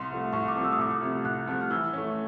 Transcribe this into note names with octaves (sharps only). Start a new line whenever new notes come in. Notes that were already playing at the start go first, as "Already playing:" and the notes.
Already playing: C2 C6
C3 F3 A3
C2 C#6
D6
C3 F3 A3
E6
D#6
C2 D6
D#6
C3 F3 A3
C2 F#6
C3 F3 A3 F#6
F6
E3 E6
A3 C#4